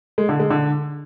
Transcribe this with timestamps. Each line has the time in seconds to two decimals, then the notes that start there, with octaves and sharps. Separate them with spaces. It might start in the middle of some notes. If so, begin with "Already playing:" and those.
0.18 G#3
0.29 D3
0.40 G#3
0.50 D3